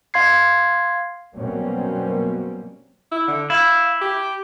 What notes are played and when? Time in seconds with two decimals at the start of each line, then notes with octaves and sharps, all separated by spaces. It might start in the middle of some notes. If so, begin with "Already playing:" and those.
0.14 F5 C6 G#6 C7
1.36 B2 F#3 G3 A#3 C4 C#4
3.12 E4
3.28 D3
3.50 E4 F5
4.01 G4